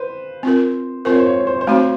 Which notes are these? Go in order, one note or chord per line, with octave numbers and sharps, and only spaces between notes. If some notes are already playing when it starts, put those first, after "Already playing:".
Already playing: B4 C5
C4 F4 A#4
C4 F4 A#4 C5
C#5
C5
C#5
C5
C#5
C5
C#5
C5
A3 C4 D#4 F#4 C#5
C5